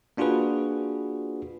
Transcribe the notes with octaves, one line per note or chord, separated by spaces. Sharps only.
A#3 D4 F4 F#4 G#4 B4